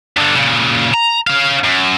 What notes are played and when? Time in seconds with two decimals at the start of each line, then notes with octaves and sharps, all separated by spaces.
0.17 G2 D3
0.36 A#2 C#3
0.94 A#5
1.27 C#4 F5
1.64 F#2